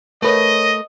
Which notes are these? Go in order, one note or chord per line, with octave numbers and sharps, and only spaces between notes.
A3 A#4 B4 C#5 D#5